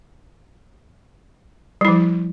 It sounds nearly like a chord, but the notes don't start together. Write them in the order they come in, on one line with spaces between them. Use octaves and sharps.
G3 E4 F3